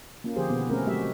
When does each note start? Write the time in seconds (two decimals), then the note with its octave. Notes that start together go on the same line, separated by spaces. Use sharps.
0.24 A#3 C#4 F4
0.36 D3 F3 G4 G#4 C5
0.49 B2 D#3 B3
0.70 A3 C4 C#4 G#4 A#4
0.87 F#3 G#3 A3 F#4 G4 E5